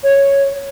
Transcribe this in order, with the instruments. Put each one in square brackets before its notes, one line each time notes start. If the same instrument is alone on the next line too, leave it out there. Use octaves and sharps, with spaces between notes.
[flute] C#5